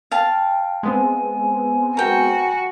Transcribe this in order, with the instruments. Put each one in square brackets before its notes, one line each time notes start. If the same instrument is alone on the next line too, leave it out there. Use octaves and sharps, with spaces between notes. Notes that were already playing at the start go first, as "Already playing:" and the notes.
[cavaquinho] F5 A5 [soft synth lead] G5
[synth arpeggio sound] G#3 B3 C4 [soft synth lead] G#5
[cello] F#4 [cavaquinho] A#4 G5